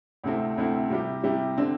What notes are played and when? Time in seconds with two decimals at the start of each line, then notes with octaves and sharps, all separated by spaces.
0.24 D2 C3 A3 C4 E4
0.58 D2 C3 A3 C4 E4
0.90 C3 G3 E4 G4
1.23 C3 G3 E4 G4
1.58 D3 C4